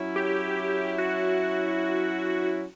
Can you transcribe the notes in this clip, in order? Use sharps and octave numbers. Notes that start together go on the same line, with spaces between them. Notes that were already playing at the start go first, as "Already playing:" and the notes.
Already playing: F#3 C#4 E4
G4
F#4